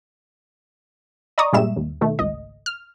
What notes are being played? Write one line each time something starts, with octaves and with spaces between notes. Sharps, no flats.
D5 D#5 A#5 C#6 D#6
G2 A#2 G3 G#3 E5 E7
D#2
B2 D#3 A3
G#1 C#2 D#5
F6